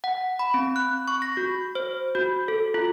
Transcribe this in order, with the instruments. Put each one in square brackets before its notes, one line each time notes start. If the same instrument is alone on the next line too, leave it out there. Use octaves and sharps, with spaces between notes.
[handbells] F#5
B5
C4
F#6
C#6
A#6
F#4
C5
F#4
A4
F4